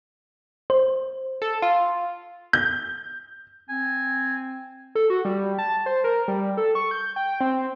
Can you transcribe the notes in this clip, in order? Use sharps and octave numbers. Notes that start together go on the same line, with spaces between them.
C5
A4
F4
G6
C4 G#5
A4
F#4
G3
A5
C5
A#4
G3
A4
C#6
G6
G5
C4